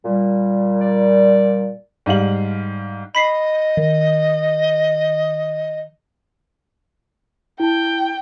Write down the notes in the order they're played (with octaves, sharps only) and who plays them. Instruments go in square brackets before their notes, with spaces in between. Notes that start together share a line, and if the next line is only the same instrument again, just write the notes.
[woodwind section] A#2 G3
[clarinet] D5
[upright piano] G#2 G3 F5 F#7
[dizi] D#5 [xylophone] B5 B6 C7
[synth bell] D#3
[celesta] E4 A5 [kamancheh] G5